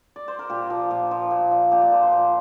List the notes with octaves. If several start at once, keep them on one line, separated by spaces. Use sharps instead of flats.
D5
C5
A#4
A#2 G4
F3
A#2
F3
A#2
F3
A#2 G4
D5
F3 C5
C5
A#2 A#4